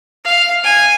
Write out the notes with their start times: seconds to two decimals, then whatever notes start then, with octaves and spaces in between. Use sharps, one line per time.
0.25 F5
0.64 G#5